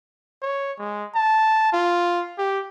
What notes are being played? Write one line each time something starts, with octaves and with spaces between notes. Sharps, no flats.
C#5
G#3
A5
F4
G4